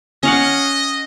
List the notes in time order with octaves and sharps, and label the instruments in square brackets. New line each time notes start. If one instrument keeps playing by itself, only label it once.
[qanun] C#4 F5 F#5 [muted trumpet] D#5